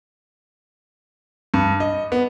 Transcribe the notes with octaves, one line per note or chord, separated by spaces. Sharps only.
G2
D#5
B3